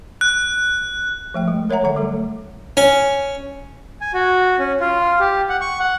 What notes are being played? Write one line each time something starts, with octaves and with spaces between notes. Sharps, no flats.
F#6
F3 A3 G5
G#3
A#4 C#5 E5 F#5 A#5
D3 F#3 F#5 A#5
G3 A3 A4
C#4 G#5
G#5
F#4
C#4
F4
G4
F#5
C#6
F#5